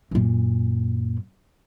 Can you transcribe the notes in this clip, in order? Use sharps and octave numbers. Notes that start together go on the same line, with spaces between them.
F#2 A#2